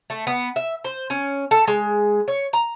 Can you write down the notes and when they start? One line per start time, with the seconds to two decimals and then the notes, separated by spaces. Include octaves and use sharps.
0.10 A3
0.27 B3
0.56 E5
0.85 C5
1.10 C#4
1.51 A4
1.68 G#3
2.28 C#5
2.53 A#5